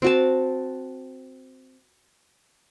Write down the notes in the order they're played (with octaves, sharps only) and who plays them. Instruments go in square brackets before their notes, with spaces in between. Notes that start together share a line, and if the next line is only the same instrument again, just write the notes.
[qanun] C4 F#4 A5